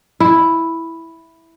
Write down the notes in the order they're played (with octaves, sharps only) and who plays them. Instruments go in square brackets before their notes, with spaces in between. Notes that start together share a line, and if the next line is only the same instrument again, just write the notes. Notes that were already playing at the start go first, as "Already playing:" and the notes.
[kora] E4